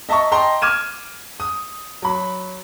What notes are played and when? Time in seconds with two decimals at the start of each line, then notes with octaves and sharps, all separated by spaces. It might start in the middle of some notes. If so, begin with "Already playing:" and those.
0.09 D#5 E5 A5 A#5 C#6
0.32 D#5 G5 A5 A#5 C6
0.62 D6 F6 G#6 D#7 E7
1.40 D#6
2.02 F#3 B5